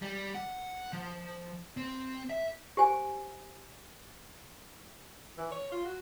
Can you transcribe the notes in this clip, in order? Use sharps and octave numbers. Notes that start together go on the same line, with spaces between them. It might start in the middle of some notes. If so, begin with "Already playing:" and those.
G3
F#5
F3
C4
E5
G4 C5 G#5
E3
C#5
F4
F#4